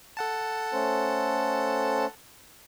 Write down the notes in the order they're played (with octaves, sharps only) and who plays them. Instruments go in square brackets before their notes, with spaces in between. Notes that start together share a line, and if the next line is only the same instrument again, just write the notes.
[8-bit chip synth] A4 F#5 A5
[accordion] A3 C#4 C5